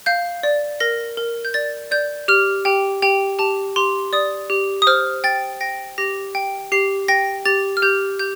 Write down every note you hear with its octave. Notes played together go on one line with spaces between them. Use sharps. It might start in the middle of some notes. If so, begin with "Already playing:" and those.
F5 G6
D5
A#4 A#6
A#4
G6
D5 A6
D5 G6
G4 F6
G4 G5
G4 G5
G4 A5
G4 C6
D5 D#6
G4
D#6
C5 F6
G5 A6
G5 A#6
G4 A#6
G5
G4 C7
G5 A#6
G4 A6
F6
G4 G6
G4 G6